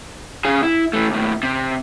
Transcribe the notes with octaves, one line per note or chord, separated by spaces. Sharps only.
C#3 G#4
E4
E3 A3
D#2 A2
C3